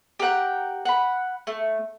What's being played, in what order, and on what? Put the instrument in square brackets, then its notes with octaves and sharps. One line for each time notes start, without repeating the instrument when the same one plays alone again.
[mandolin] G4 A#4 F#5 G5
F#5 B5
A3